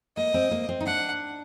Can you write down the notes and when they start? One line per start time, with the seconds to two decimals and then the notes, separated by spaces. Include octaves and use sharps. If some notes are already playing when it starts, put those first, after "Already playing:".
0.17 A#3 D#5
0.34 C4
0.51 A#3
0.69 C4
0.80 D#4
0.86 D4 F#5